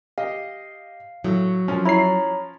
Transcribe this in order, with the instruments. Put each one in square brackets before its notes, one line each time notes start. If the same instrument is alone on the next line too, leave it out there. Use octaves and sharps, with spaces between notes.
[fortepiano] G4 D#5 [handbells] F5
[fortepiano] A2 [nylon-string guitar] F#3
[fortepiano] F3 C#4
[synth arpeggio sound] E4 C7 [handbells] C#5 A#5 B5